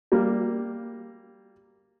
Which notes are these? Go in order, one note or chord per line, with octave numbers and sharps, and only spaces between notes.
G3 A#3